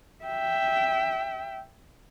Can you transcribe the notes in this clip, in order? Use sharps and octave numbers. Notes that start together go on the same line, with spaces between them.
E5 G5